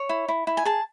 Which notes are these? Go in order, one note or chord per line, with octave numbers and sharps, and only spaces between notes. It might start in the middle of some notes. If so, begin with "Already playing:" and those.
Already playing: C#5
E4
E4
E4
G#5
G#4 A5